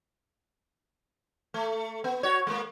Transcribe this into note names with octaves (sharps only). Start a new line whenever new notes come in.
A3
B3
F#4 C#5
G#3 A#3